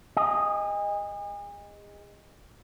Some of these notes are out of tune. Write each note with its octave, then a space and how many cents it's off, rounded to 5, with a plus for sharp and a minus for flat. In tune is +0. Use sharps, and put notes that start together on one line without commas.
G#4 -35 D#5 +0